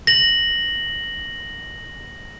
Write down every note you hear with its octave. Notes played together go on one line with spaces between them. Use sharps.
A#6 F#7